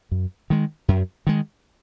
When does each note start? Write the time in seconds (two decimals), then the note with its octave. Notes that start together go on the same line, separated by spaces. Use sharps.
0.12 F#2
0.50 D#3 G#3
0.88 F#2
1.27 D#3 G#3